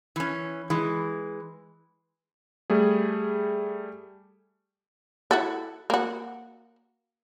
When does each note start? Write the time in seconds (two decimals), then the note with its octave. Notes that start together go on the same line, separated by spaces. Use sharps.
0.16 E3 C#4
0.70 E3 G#3
2.70 G3 A3 G#4
5.31 E4 F#4 A4
5.90 A#3 F#4